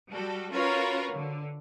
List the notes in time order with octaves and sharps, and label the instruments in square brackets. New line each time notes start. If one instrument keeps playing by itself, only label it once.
[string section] G3 F#4 A4
C#4 F4 F#4 A#4 B4 C#5
D3